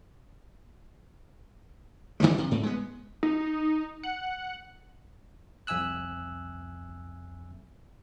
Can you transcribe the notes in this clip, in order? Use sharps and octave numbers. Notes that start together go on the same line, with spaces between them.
D3 D#3 F3 G3
C3
G#2
G#3 B3
D#4
F#5
C2 F2 E5 G#5 E6 F#6